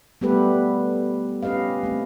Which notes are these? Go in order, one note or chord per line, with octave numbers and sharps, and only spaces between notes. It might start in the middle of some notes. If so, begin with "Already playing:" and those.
G3 A3 B3 G4 A4 B4
C#4 G4 B4 D#5 F5
A3 C4